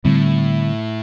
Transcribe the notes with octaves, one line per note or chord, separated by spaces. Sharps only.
A2 D3 G3 C4